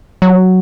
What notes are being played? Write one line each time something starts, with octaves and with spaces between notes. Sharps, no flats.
F#3